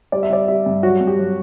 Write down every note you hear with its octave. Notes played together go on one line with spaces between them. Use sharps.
G3 D5
E5
G3 D5
G3 E5
G2
F#3 F#4
G2
G4
F#3